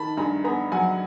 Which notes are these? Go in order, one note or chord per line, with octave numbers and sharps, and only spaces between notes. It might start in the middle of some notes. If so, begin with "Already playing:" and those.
Already playing: D#3 A5 B5
G2 G#5 A#5
B3 G#5 A#5
F#3 F#5 G#5